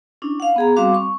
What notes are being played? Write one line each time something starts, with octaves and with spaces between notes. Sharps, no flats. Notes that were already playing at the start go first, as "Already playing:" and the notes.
C#4 D4 E4
F5 F#5
B3 G#4 A#5
G3 C4 F#4 F5 D6
C#6